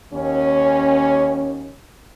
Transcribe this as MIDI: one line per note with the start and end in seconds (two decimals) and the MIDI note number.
0.13 1.74 39
0.13 1.74 61